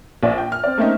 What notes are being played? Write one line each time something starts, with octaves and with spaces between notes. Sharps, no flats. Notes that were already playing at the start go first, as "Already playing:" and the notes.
A#1 D5 C#6
G5
F6
C4 D5
A3 A#3 C4 C#4 D#4